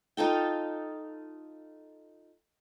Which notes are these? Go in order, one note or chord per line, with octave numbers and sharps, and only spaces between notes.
D#4 F4 A4 G5